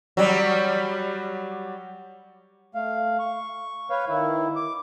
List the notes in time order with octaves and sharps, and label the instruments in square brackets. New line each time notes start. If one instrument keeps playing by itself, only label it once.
[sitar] F#3 G3
[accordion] A3 F5
C#6
B4 C#5 F5
D#3 E4
D6